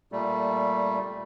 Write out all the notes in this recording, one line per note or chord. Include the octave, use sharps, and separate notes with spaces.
A#2 G3 A3